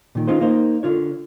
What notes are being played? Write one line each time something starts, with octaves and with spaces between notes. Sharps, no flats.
A#2 D#3
C#4 D#4 F4 G#4 C5
A#3 D#4 C5
D3 F4 C#5